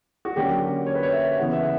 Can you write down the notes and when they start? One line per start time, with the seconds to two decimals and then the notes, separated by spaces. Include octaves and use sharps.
0.25 F#4
0.36 D3 F#3 A#3 C#4 G4
0.87 C#5
0.95 B4
1.03 C#5
1.12 E5
1.37 C#3 E3 B3 F#5
1.53 E5
1.63 F#5